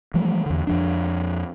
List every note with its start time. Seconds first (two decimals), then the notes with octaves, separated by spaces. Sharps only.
0.14 E3 F3 G3 A3
0.46 E2 D3
0.67 F2 F3 D4